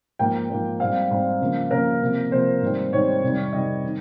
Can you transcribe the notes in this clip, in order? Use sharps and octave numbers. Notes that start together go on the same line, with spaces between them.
G#2 F3 A#3 G5
G#2 F3 A#3
G#2 G3 C4 F5
G#2 G3 C4
C#3 F3 A#3
C#3 F3 A#3 A#4
C3 F3 A#3
C3 F3 A#3 C5
G#2 D#3 G3 C4
G#2 D#3 G3 C4 C#5
F2 C3 D#3 G3
F2 C3 D#3 G3 D#5
D#3